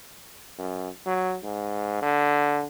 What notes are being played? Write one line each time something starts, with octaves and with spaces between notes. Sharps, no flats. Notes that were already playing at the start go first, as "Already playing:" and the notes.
F#2
F#3
G#2
D3